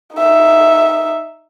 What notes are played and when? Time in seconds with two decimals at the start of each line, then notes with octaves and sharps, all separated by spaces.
0.16 D#4 E5